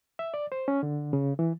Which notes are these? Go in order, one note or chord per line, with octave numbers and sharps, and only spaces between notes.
E5
D5
C5
C#4
D3
C#3
E3